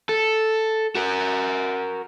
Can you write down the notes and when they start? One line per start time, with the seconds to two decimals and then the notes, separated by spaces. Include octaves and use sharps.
0.09 A4
0.95 F#4 A#4